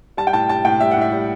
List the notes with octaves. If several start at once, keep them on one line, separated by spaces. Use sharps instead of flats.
G3 A5
G5
A2 A5
G3 A5
A2 G5
G3 E5
F#5
A2 E5
G3